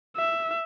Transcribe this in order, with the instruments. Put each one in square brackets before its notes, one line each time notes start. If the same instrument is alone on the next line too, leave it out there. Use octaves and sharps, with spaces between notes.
[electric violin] E5